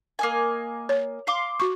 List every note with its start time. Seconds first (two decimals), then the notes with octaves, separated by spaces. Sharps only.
0.19 A#3 D#5 G#5
0.89 C#5
1.27 F5 C6 D6
1.60 F#4 C#6